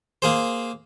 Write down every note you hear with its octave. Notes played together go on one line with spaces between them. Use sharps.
A#3 G#4 C5